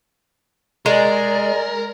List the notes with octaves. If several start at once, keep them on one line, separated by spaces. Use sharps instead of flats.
G#3 A#4 D5